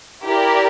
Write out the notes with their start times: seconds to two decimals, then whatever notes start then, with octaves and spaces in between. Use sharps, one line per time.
0.23 E4 G4 A#4 D5